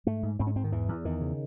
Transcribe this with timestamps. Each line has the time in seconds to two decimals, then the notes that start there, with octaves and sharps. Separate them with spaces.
0.06 G#2 A3
0.23 G#2
0.39 G#2 C4
0.47 C#4
0.56 G#2 C4
0.64 D#3
0.72 E2 E3
0.88 E2
1.05 E2 D#3
1.21 C#3